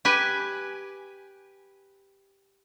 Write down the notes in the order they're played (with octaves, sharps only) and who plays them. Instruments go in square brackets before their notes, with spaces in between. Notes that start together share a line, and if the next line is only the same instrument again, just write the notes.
[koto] G4 B4 G#5